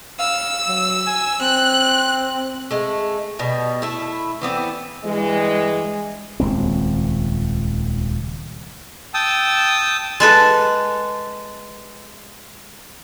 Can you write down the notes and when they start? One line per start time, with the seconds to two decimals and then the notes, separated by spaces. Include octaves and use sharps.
0.19 F5 E6
0.68 F#3
1.07 G#5
1.41 C4 F#6
2.71 G#3 A3
3.39 B2 G3
3.82 A3 E4
4.42 E3 B3 C4 D5
5.04 G2 E3 G3 G#3
6.40 D#1 C#2 C4
9.14 G5 A5 D#6 E6
10.20 G#3 A4 B4